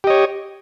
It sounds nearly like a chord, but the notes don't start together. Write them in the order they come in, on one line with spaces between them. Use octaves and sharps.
G4 D#5 C#5